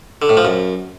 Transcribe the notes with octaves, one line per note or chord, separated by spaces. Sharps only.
D3
A2
F3
F#2